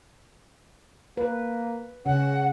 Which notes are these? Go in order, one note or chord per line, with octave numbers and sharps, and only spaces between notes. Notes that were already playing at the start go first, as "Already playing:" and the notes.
A#3 B4
C#3 C#4 F#5